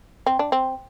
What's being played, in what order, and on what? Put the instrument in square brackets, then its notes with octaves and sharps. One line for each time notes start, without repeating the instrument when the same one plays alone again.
[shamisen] C4
D4
C4